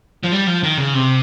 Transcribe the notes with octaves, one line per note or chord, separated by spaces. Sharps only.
F3
G3
F3
D#3
C#3
C3